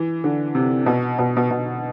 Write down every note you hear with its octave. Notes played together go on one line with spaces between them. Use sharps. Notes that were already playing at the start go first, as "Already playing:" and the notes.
Already playing: E3
D3
C3
B2
B2
B2
B2